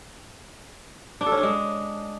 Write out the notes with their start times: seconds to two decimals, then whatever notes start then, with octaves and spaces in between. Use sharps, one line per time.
1.21 D4
1.26 A4
1.32 C#4
1.37 D4
1.43 G#3